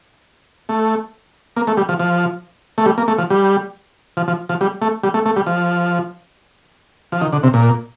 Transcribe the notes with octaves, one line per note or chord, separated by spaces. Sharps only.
A3
A#3
A3
G3
F3
F3
A3
G3
A#3
A3
F3
G3
F3
F3
F3
G3
A3
G3
A3
A3
G3
F3
F3
D#3
D3
C3
A#2